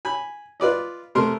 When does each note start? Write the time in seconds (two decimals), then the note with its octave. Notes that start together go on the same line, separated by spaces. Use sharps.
0.05 G#5 B5
0.60 F4 B4 D5 D#5
1.15 C3 A3 A#4 C6 F6